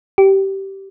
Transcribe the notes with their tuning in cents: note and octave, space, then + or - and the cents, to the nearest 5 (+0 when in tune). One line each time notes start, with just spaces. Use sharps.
G4 -15